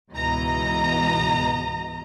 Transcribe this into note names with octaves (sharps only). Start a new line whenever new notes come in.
C#2 G#2 B2 E3 D#5 A#5